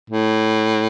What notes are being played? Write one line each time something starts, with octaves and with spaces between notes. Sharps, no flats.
A2